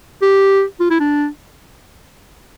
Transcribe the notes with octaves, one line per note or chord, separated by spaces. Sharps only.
G4
F4
E4
D4